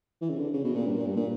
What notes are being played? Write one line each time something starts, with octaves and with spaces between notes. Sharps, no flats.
E3
C#3
D3
C#3
B2
A#2
G2
A#2
G2
A#2